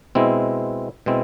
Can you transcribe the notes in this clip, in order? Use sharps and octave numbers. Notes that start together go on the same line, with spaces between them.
B2 G#3 C4 E4
B2 G#3 C4 E4